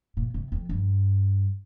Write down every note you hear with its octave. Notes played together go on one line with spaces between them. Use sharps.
A#2
C3
F2
G2